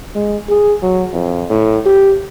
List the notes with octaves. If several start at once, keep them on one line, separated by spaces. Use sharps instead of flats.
G#3
G#4
F#3
F2
A2
G4